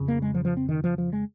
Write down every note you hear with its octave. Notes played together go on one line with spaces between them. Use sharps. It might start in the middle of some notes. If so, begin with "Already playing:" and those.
Already playing: F2 C#3
A#3
G#3
F3
F3
C4
D#3
F3
F3
G#3